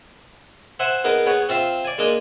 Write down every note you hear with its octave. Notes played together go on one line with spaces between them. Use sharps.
C5 E5 F#5 G#5
B3 D#4 G#4 A#4 B4
B3 G#4 B4 C#5
C4 F4 E5 F5
D5 G#5
G#3 A#3 D4 D#5 G#5